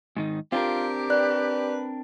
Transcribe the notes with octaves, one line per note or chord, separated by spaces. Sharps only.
G#2 D#3 D#4
C4 D4 F4 G4 A#4
B4 D5 F#6